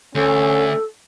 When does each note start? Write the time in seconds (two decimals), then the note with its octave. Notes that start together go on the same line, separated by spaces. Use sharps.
0.15 D2 C#4 A4